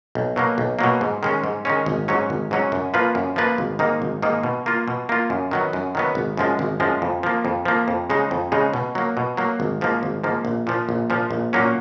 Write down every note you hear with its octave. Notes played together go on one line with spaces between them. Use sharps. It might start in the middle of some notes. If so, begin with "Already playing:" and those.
B1
B2 F#3 A#3
B1
B2 F#3 A#3
G#2
D#3 G#3 C#4
G#2
D#3 G#3 C#4
G#1
G#2 F#3 C#4
G#1
G#2 F#3 C#4
F#2
F3 A#3 F4 B4
F#2
F3 A#3 F4 B4
G#1
G#2 D#3 A#3 D#4
G#1
G#2 D#3 A#3 D#4
B2
A#3 F4
B2
A#3 F4
F#2
D#3 F#3 B3
F#2
D#3 F#3 B3
G#1
F#2 F3 G#3
G#1
F#2 F3 G#3
F2
F3 A#3
F2
F3 A#3
F2
C#3 G#3 D#4
F2
C#3 G#3 D#4
B2
F#3 A#3
B2
F#3 A#3
G#1
G#2 F3 A#3
G#1
G#2 F3 A#3
A#1
A#2 F3
A#1
A#2 F3
A#1
A#2 F#3 A#3 C#4